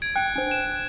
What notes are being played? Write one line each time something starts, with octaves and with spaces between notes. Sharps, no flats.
G#6 D7
G5 F#6 D7
D4 C5
E7